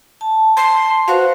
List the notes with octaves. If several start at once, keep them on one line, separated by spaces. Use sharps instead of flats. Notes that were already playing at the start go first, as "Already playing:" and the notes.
A5
C6
F#4 B4 C5 F5